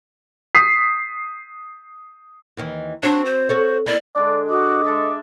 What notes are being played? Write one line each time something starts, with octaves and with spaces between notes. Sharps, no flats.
D#6 B6 C7
D#2 D#3 E3
C4 D4 F#4 C#5
C5
F#4 A4 C#5
A#3 E4 D5
D3 G#3 D4 D5
F#4 D#5 D6
G#3 A4 D5 E5